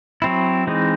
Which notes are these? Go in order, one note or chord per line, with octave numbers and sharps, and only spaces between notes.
F#3 C4 E4
E3 G#3 C4 D#4